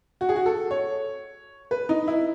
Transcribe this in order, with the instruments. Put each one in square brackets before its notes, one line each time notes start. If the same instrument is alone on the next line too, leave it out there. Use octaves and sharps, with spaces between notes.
[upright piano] F#4
G#4
F#4
A4
C#5
B4
D#4
E4